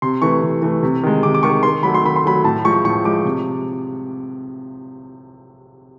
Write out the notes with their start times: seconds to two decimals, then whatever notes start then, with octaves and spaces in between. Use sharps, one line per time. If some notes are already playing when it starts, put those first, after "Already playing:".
0.02 C3 C6
0.22 E3 A3 C#6
0.42 C3
0.62 E3 A3
0.83 C3
1.03 D#3 G#3
1.23 C3 D6
1.34 D6
1.43 D#3 G#3 C#6
1.63 D#3 C6
1.83 F#3 A3 B5
1.95 C6
2.04 D#3 B5
2.16 C6
2.23 F#3 A3 B5
2.44 A2 A5
2.64 F3 G#3 C#6
2.84 A2 C#6
3.05 F3 G#3 D6
3.25 C3